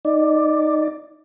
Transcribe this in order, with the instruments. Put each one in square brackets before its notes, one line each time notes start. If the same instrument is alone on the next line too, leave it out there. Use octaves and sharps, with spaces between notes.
[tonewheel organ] D#4 D5